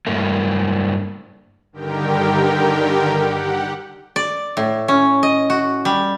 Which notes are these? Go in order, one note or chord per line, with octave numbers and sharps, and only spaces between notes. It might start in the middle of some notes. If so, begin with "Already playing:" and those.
G2 A3 A#3
G2 D3 D#3 G4 A#4 G5
G4 F#5
D5
A2
C#4
D#5
F#4
G3